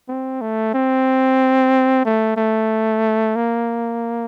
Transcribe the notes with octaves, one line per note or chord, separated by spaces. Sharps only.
C4
A3
C4
A3
A3
A#3